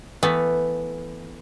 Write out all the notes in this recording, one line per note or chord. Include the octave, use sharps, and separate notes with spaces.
E3 A3 B3